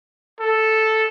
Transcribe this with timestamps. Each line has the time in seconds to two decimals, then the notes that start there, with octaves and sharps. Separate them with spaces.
0.40 A4